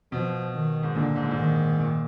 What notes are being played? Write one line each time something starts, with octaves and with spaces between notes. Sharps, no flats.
B2 F3
D#3
G#2
A#2 D3
G#2
A#2
G#2
D#3
A#2